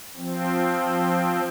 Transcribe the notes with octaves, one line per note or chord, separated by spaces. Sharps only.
F3 C4